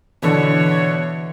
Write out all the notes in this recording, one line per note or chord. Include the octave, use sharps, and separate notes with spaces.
B2 D3 E3 D4 C#5 B6